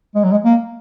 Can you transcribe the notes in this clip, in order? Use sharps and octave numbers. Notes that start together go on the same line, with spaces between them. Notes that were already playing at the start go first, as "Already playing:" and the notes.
G#3
F#3
G#3
A#3